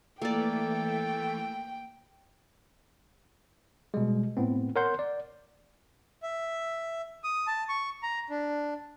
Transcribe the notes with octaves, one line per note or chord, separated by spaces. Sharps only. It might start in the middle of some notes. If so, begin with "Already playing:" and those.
E3 A3 A#3 A4 D5 G5
B2 G3 G#3
A2 B3 C4
A#4 C#5 F#5 C6 G6
D5
E5
D#6
A5
C#6
A#5
D4